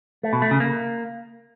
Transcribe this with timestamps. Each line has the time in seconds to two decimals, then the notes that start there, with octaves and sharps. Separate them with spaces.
0.23 A3
0.33 B2
0.42 A3
0.51 C#3
0.60 A#3